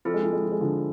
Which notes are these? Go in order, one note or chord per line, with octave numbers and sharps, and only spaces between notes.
F3 C4 E4 A4
G#3
F3
G#3
F3
G#3
D3 F3